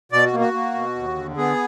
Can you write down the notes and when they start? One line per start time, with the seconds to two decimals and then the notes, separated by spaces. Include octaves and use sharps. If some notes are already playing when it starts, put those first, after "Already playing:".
0.12 B2 D5
0.26 F#4
0.33 A#3
0.40 F#4
0.53 A#3
0.74 B2
0.96 D#2
1.16 D3
1.37 B3 G#4